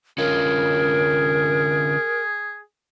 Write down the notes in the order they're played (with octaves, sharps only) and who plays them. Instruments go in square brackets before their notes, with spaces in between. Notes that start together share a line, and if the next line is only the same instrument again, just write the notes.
[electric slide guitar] D3 C#4 F4 [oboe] G#4 [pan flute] A#4